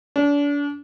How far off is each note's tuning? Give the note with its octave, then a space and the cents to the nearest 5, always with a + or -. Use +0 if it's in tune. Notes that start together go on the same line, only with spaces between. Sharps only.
D4 -35